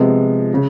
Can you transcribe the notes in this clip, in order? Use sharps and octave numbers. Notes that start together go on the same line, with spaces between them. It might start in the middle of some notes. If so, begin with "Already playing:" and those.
Already playing: C3 F3 G#3 B3
C#3